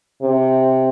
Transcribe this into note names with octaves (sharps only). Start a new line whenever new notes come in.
C3